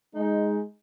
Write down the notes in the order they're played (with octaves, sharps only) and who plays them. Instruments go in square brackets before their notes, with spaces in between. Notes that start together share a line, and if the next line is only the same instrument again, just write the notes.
[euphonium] G#3 [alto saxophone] D#4